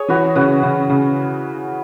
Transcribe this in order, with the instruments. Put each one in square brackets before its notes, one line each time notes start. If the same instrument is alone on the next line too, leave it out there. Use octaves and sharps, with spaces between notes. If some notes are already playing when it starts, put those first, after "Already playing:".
Already playing: [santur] G#4 C#5
[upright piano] E3 [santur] F#4 B4
[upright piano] C#3 [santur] F#4 B4
[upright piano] C#3
C#3